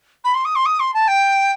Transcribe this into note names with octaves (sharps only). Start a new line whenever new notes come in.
B5
C6
D#6
C6
D#6
C6
A5
G5